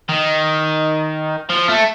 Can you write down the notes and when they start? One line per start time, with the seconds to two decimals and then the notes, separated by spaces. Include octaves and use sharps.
0.09 D#3
1.50 F3
1.69 A3